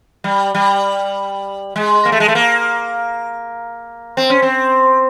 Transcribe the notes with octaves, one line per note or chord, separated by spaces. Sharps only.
G3
G3
G#3
A#3
A3
G#3
A3
A#3
C4
C#4
C4